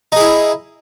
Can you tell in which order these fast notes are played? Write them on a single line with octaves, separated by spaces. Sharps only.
D#4 G#4 E4